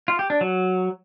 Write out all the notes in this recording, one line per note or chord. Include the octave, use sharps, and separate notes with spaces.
F4
G4
D4
F#3